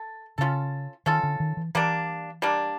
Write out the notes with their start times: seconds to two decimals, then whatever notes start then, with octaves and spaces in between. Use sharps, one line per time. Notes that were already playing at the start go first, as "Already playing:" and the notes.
Already playing: A4
0.38 C#3 C#4 F4 A4
1.06 D#3 C#4 F4 A4
1.23 D3
1.40 D#3
1.57 E3
1.75 E3 G3 A#3 D4
2.42 G3 A#3 D4